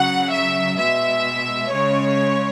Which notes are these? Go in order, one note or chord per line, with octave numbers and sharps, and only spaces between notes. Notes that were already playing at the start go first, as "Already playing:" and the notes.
Already playing: C#3 F#3 F#5
E5
B2 G#3 E5
C#3 G#3 C#5